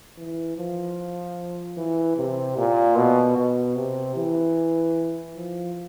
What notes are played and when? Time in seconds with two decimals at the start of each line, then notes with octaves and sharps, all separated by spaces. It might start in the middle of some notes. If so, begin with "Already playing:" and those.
0.18 E3
0.57 F3
1.77 E3
2.17 C3
2.57 A#2
2.96 B2
3.37 B2
3.76 C3
4.16 E3
5.35 F3